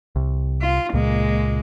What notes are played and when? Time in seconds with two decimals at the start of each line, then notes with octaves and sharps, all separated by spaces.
0.16 C2
0.61 F4
0.94 C#2 A#2 G#3 A#3